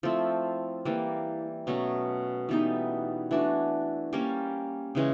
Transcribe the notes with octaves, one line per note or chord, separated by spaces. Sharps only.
F3 A3 C4 E4
E3 G3 A#3
B2 F#3 A3 C#4
E3 G3 B3 D#4
E3 A3 D4 F#4
G3 A#3 C#4
C#3 E3 G#3 C#4